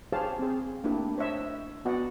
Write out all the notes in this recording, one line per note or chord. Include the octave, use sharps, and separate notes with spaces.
G4 G#4 C5 C#5 F5 A5
C4 G#4
A3 A#3 D4 E4 G4
C5 C#5 D#5 E5
B3 F#4 D5 D#5 F#5